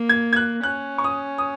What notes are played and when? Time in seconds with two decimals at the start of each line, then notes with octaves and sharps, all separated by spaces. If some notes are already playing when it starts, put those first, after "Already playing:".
Already playing: A#3
0.09 G#6
0.33 G#6
0.36 F#6
0.63 C#4 F#6
0.98 C#6
1.04 D#6
1.38 D#6